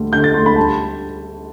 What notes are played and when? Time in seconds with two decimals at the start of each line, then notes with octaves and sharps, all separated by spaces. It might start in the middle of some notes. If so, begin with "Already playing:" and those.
Already playing: D2 G3
0.12 D3 G6
0.24 A6
0.34 D2 C6
0.46 B5
0.56 G3 A5